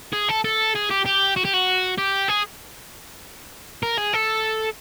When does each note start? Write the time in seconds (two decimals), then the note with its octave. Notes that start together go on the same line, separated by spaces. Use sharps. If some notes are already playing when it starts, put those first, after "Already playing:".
0.13 G#4
0.29 A4
0.44 A4
0.75 G#4
0.90 G4
1.05 G4
1.36 F#4
1.45 G4
1.54 F#4
1.98 G4
2.29 G#4
3.83 A#4
3.98 G#4
4.13 A4